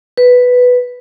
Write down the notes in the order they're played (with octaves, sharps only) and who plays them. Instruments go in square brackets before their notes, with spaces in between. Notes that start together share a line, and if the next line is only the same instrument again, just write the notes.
[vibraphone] B4